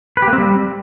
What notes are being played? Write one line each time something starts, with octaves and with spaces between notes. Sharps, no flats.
B4
G4
A#3
C4
G3